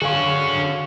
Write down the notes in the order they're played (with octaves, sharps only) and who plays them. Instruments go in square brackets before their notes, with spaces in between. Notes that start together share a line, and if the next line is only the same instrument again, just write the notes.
[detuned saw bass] D3 [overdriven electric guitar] C#4 F#4 [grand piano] G#4 F5 C#6